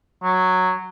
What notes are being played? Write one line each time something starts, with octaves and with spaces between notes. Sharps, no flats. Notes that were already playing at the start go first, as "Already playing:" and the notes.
F#3